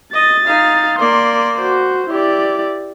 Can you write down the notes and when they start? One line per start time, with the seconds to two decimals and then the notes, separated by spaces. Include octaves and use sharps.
0.14 D#5 A6
0.47 D#4 F5
0.99 A#3 D5 C6
1.56 F#4 C5
2.10 E4 G4 D5